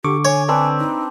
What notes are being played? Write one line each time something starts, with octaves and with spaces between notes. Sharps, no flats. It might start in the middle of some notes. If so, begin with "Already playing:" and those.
D3 G4 C#6 D6
C#5 G#5
C4 D4 B4 G#5
D#4